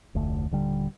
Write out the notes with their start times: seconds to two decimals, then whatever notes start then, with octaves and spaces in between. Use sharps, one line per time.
0.15 F1 D2 A3
0.51 D#1 D3 G3